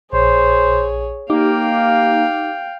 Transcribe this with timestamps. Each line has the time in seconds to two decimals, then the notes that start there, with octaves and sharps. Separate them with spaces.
0.12 A#1 G#4 C5 C#5
1.30 A#3 D#4 G4 F5 G5 D6